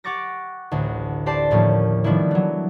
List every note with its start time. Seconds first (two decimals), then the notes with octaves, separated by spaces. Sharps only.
0.04 G4 F#5 C#6 D6 A6 A#6
0.71 A1 D2
1.26 G4 C5 D5 A5 C6 D6
1.51 D#2 A2 F3 A3 A#3 C#4
2.04 D#3 F3 G3 B3 D4 E4
2.31 E3 F#3